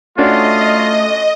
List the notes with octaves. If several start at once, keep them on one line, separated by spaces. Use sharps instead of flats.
A3 C#4 D4 F4 F#4 D#5